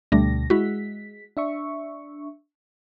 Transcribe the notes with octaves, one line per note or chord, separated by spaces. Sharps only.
D2 B2 G3 A3 D4 A#6
G#3 E4 F#4 B6
D4 E5 C#6